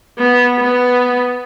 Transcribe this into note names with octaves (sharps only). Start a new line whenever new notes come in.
B3
B3